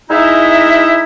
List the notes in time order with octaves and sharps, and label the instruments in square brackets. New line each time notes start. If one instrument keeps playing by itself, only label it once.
[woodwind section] G#3 D#4 E4 E5